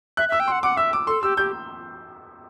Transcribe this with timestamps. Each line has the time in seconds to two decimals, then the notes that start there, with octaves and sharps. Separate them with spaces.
0.17 E5 F#6
0.29 E5 E6
0.40 G5
0.48 F#5 C6
0.63 F#5 D6
0.77 E5 E6
0.93 D6
1.07 A4 C6
1.23 G4 E6
1.37 G4 G6